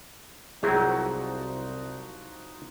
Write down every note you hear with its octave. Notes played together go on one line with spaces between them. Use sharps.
C2 F3 F#3 C4 D#4 E4 F#4 G#4